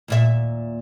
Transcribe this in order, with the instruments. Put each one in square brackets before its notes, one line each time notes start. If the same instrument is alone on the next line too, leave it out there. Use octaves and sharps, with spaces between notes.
[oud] D#2 A#2 E5